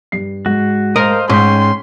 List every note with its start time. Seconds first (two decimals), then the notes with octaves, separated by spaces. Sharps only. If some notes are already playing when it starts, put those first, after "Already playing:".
0.12 G2 C7
0.46 G#2 F#4
0.96 A#4 C5 D#5 F5
1.30 G#2 C#4 G5 C6 C#6 B6